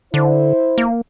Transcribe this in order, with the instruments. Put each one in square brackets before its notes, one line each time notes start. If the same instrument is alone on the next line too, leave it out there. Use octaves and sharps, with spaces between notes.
[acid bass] D3 [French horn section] E4 C5
[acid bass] A#3